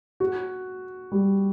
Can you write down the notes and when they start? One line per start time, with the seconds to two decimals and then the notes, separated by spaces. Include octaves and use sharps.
0.20 F#4
1.12 G3